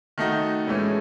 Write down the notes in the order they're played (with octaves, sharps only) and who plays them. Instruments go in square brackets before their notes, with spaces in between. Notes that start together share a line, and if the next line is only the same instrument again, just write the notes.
[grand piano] D#3 A3 D#4 F#4
[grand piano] A2 E3 A3 C#4 [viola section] G#3